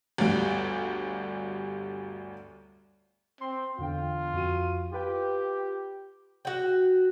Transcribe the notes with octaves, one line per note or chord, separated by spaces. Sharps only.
G1 D2 G3 D7
C4 C6
E2 D3 F4 G5
F2 F#4 D#7
F4 G4 B4 G5
F#4 G5